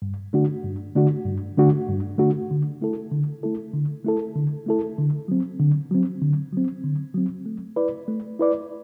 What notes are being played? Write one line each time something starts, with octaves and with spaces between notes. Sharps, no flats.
G2
D3 A3 D4 F#4
G2
D3 A3 D4 F#4
G2
D3 A3 D4 F#4
G2
D3 A3 D4 F#4
D3
A3 E4 A4
D3
A3 E4 A4
D3
A3 E4 A4
D3
A3 E4 A4
D3
F#3 C4
D3
F#3 C4
D3
F#3 C4
D3
F#3 C4
A3
E4 B4 D5
A3
E4 B4 D5